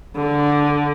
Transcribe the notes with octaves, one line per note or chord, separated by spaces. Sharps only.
D3